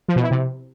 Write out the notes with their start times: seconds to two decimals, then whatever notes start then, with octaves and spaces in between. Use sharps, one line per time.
0.09 F3
0.16 B2
0.23 E4
0.31 C3